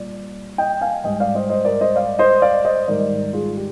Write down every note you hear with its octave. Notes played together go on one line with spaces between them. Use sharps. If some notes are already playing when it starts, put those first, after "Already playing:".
Already playing: A#2 G3 D5
D#5 G5
F5 G#5
G#2 G3 D#5 G5
D5 F5
C5 D#5
C5 D#5
A#4 D5
C5 D#5
D5 F5
C5 D#5
D5 F5
C5 D#5
G#2 D#3 G3 A#4 D5
F4 G#4
G4